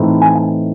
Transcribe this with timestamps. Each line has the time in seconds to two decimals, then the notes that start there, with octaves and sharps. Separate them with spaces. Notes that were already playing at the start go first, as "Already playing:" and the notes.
Already playing: A2 E3 C4 D#4
0.22 G#5